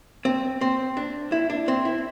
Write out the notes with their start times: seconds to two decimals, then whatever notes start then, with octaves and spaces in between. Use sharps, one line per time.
0.25 C4
0.61 C4
0.97 D4
1.32 E4
1.50 D4
1.68 C4
1.85 E4